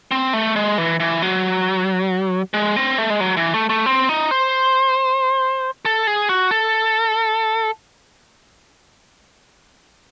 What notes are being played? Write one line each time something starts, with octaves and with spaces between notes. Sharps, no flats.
C4
A3
G#3
E3
E3
F#3
G#3
C4
A3
G#3
F#3
E3
A3
A3
C4
D#4
C5
A4
G#4
F#4
A4